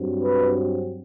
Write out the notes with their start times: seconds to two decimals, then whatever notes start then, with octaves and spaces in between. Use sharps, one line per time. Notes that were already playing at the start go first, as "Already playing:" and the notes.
Already playing: G2 F#3 C4
0.23 B4